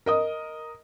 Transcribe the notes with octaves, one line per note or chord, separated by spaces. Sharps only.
A#4 D#5 D#6